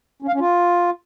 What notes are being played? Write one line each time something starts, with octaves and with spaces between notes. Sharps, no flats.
C#4
F5
C#4
F4